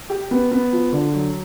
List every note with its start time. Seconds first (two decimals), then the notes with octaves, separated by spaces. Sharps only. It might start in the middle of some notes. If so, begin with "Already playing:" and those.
0.10 G4
0.31 B3
0.51 B3
0.73 F3
0.92 D3
1.13 F#3